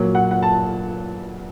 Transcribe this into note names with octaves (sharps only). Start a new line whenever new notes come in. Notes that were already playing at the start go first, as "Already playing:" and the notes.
Already playing: A#2 F#3 A#3
F#5
F#5
A5